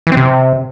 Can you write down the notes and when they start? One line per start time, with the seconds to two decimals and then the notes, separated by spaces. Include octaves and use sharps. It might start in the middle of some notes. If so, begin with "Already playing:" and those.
0.07 E3
0.12 C4
0.17 C3